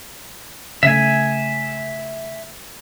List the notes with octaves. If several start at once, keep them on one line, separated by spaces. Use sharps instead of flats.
C#3 A3 E5 G#5